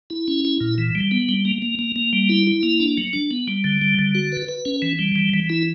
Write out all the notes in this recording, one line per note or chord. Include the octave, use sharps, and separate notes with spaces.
E4
C#4
E4
A#2
E3
G3
B3
G3
A#3
A#3
A#3
A#3
G3
E4
E4
A#3
D4
F#3
D4
B3
G3
D3
G3
D3
F#4
B4
B4
C#4
E3
G3
E3
E3
E4